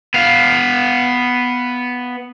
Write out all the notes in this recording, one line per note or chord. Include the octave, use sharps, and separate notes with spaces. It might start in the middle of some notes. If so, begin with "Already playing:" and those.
B3 F5